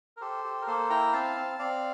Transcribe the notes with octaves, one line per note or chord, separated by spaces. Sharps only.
A#4
G4 A4 C5
G4
A#4
A#3 A4 C5
E4 G5 A#5
C4 F5 A5
C4
C4 D5 F5